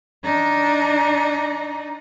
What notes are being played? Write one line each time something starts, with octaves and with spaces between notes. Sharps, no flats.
D4 D#4